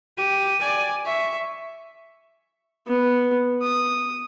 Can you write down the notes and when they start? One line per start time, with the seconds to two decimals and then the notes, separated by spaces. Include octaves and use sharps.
0.17 G4 D#7
0.60 D5 G#5
1.05 E5 C#6
2.88 B3
3.62 D#6